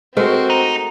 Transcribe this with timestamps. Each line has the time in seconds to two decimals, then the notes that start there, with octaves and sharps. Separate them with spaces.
0.17 G#3 A3 C4 F#4 A#4 C5
0.50 D#4